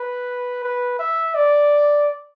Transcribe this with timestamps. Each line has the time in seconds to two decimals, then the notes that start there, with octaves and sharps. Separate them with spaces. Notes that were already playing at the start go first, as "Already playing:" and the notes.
Already playing: B4
0.64 B4
0.99 E5
1.35 D5